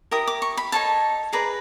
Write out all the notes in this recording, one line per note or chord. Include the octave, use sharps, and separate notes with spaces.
E4 G4 A#4 D#6
D6
C#6
B5
D#4 F#4 A4 C#5 A5
G#4 B4 D5 A#5